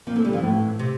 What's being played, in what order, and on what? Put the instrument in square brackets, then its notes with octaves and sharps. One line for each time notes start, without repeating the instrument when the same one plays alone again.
[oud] F3 [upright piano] A#3
[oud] E3 [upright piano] A3
[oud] D3 [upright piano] G3
[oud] E3 [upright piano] F3
[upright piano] A2
[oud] C3